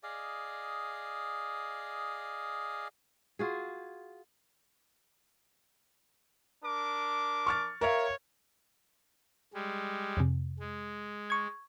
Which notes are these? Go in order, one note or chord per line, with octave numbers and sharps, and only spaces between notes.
G#4 D5 D#5 F5
F4 F#4 G#4
D4 A#4 D6
C#6 F6 A6
A#4 C#5 E5 F5
G3 G#3
F2 C3
G#3
C#6 G#6